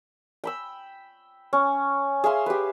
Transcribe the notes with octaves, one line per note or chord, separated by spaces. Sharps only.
G5 B5 E6
C#4
G#4 E5 F5 C6
G4 B4